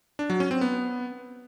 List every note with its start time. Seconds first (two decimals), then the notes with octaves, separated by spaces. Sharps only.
0.19 D4
0.30 F#3
0.40 C#4
0.51 C4
0.61 B3